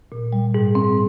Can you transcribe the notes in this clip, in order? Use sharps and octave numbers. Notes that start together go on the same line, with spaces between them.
A#2
G3
G#2
C4